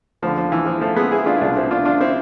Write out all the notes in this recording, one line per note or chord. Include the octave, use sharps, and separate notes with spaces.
D2 D3 F3
F3
E3
F3
F3 A3
G#3 B3
E4 G#4
D4 F4
E4
C2 B2 D4 F4
C4 E4
D4 F4
D4 F4
C4 E4